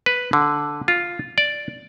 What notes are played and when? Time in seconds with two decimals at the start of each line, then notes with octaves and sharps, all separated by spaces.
0.06 B4
0.33 D3
0.88 F4
1.38 D5